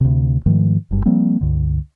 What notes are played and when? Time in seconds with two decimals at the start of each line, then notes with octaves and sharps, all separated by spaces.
0.01 D2 C3
0.46 G#2 D#3 F3 A3
0.91 F#1 G2
1.06 F3 G3 A#3 C4
1.41 C#2 G2 D3